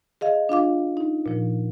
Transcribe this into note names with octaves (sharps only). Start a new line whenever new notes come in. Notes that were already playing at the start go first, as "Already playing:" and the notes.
G#4 D#5 F5
D4 F4 F5 D6
D#4
A#2 F3